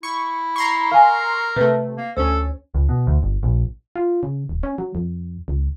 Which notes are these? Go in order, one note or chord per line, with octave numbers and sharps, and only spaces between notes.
E4 C#6
A#5 C6 C#6
A#4 F5 G#5
C3 A3 B4
A#3
D2 C#4 A4 C5
C#2
B2
D2
G1
A#1
F4
C#3
D#1
C#4
F#3
F2
C#2